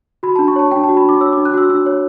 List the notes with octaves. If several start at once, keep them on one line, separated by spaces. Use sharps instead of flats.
F#4 B5
A5
D4
C#6
C#5 A5
D4 G5
A5
F#4
B5
D4 D6
C#5 E6
D6
D4
F#6
F#4 E6
D4 E6
C#5